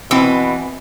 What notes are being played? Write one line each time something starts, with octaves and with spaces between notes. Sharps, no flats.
B2 E3 C4 E6